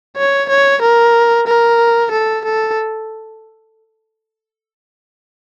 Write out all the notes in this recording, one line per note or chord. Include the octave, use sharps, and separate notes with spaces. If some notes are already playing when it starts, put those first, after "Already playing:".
C#5
C#5
A#4
A#4
A4
A4